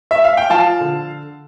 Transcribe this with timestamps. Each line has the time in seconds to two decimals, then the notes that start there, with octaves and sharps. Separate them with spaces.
0.11 E5
0.24 F5
0.37 G5
0.50 F3 F5 A5
0.81 D3